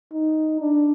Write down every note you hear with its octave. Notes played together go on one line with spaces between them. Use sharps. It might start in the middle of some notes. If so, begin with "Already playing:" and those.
D#4
D4